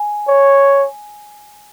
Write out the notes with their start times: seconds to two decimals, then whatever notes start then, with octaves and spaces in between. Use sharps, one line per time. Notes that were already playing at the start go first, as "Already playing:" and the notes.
Already playing: G#5
0.28 C#5